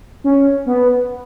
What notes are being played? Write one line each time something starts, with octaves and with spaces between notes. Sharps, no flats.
C#4
B3